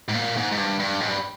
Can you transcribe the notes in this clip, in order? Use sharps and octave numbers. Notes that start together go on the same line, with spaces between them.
G#2
A#2
G#2
G#2
G2
G2
G#2
G2